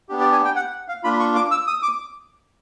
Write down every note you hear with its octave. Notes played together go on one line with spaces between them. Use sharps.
B3 D4 G4
D5
G#5
G5
F#5
F5
A#3 D4 F4 B5
C#6
D6
E6
D#6
D6